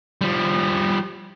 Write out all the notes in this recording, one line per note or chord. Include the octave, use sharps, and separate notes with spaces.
F3 G3